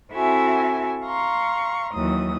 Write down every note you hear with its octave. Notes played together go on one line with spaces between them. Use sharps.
C4 E4 F#4 A4 E5 G#5
F5 A#5 C6 C#6
D#2 E3 F#3 D#6